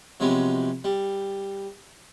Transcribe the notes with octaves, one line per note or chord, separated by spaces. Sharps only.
C3 F3 F#3 G#3 B3
G3